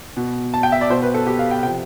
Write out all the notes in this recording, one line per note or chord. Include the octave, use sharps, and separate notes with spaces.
B2
A5
G5
E5
D5
B2 C5
B4
A4
G4
F5
G5
C3 F3 G5